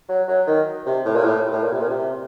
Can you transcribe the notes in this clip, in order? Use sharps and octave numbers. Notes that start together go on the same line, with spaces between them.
F#3
F#3
D#3
C3
A2
A#2
A2
A2
A#2
C3
A#2
C3